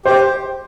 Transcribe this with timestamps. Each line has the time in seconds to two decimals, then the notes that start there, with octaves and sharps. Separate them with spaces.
0.05 G4 C5